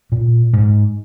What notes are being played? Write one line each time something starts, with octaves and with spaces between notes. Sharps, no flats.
A#2
G#2